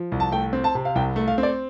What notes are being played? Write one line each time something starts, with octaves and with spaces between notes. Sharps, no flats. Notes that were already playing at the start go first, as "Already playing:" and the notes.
Already playing: F3
C2
A5
A3 G5
C4
A5
C3
F5
C2 G5
A3
F5
C4
D5